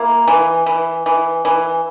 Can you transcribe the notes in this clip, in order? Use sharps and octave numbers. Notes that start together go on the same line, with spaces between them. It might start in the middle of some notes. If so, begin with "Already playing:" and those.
Already playing: A#3 E4
E3
E3
E3
E3